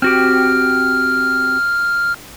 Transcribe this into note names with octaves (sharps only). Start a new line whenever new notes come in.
C4 F#4 G4 F6